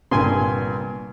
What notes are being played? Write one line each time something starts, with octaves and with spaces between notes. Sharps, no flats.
G1 C2 G2 A#2 G#5 C6